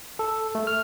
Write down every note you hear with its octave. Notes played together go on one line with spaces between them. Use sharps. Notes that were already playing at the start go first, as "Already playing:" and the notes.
A4
A3
F6